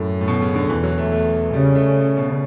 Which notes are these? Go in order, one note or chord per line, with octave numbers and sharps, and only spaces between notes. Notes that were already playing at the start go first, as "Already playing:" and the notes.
Already playing: F#2 A2
A2
B2
C#3
D3
E2 E3
F#3
A3
A3
C#3 G3
A3
B2